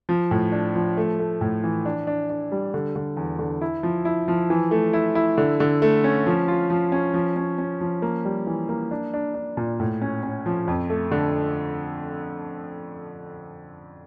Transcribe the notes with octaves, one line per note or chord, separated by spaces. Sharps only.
F3
A2
D4
F3
A3
A3
A2
E3
D4
D4
D4
G3
D3
D3
E2
D3
E4
F3
E4
F3
E3
A3
E4
E4
D3
D3
A3
C#4
F3
F4
F3
C#4
F3
C#4
C#4
F3
A#3
G3
E3
A#3
D4
D4
D4
A#2
A2
C#4
C#4
F3
F2
A3
D3